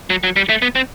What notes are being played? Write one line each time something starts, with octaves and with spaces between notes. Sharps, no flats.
F#3
F#3
G3
A3
B3
C4